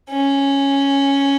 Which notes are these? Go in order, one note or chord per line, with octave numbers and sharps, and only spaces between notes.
C#4